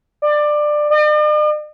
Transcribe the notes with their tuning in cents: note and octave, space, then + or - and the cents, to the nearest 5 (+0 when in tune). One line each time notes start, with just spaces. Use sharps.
D5 +20
D5 +45